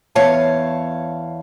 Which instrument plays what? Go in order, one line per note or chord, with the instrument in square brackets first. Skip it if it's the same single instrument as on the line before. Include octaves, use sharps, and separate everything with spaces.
[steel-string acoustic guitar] E2 C#5 F5 A5